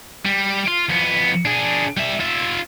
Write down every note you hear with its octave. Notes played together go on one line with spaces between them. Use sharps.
G3
F4
F2 B3
D4 G#4
G3 E5
F4 E5